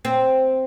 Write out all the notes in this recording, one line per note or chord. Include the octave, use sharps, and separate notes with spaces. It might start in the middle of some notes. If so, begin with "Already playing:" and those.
C4